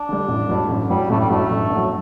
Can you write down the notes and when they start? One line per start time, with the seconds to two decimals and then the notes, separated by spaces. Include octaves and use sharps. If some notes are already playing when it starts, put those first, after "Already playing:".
Already playing: D4
0.09 D3 G3
0.28 A1
0.49 G2 F#3
0.69 A1
0.90 G2 F#3 G3
1.10 A1 A3
1.20 G3
1.30 G2 F#3 A3
1.51 A1
1.70 G2
1.75 F#3